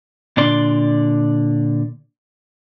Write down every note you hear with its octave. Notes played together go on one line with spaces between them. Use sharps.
A#2 D3 D5 C6